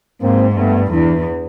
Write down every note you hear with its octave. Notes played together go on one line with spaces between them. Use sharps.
G#2 A#3 C4
G2 A3 B3
E2 D4 E4